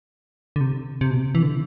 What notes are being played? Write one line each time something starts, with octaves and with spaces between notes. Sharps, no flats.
D3
C3
C3
B2
C3
E3
D3